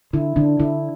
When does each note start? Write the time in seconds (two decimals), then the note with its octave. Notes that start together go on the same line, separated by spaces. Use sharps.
0.13 D3 E4
0.36 D3 D4
0.60 D3 E4